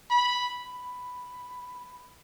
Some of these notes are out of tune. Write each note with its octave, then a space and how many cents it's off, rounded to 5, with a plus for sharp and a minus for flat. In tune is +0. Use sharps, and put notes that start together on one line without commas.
B5 -5
B5 +5